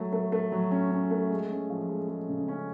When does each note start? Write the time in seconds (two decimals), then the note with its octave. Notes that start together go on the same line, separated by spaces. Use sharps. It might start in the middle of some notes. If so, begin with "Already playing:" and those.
Already playing: F#3 A3
0.13 A3
0.32 A3
0.52 F#3
0.71 C#4
0.91 C#4
1.11 A3
1.30 G#3
1.50 C#4
1.70 F3
1.89 G#3
2.09 G#3
2.29 C#3
2.48 C#4